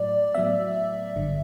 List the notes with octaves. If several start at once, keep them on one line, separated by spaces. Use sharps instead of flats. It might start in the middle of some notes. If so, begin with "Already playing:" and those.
Already playing: A2 F#3 D5
A2 F#3 B3 E5
G1 G2 D3